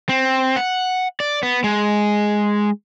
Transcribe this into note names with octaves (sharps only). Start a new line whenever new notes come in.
C4
F#5
D5
B3
G#3